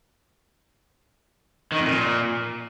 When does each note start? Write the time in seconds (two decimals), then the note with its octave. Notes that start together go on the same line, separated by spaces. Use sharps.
1.72 D#3
1.79 F2
1.85 A#2